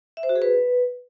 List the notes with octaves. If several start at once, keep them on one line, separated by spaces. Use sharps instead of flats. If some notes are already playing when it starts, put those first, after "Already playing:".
E5
C5
F#4
G#4
B4